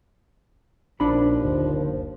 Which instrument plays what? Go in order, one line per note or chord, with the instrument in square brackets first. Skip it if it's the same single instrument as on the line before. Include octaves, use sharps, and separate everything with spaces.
[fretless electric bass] A#1 [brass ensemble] D#2 F3 [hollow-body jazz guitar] D4 B5
[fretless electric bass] F#1 D2